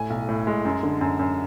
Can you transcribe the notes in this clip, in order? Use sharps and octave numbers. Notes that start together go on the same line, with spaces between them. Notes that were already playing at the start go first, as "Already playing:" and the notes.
Already playing: A2 G#5
B1
A2
G#3
F#2
D3
F#2
F#2